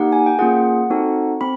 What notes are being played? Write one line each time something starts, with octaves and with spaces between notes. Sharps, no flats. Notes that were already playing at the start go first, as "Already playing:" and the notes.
Already playing: A#3 D#4 G4 F#5
G#5
G5
A#3 C#4 F4 G#4 F#5
C4 D#4 F#4 A4
C4 B5